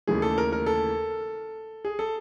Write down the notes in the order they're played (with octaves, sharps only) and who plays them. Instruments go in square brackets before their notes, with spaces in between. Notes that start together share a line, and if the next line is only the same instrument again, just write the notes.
[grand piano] D#2 C#3 E3 A3 G#4
A4
A#4
A#4
A4
G#4
A4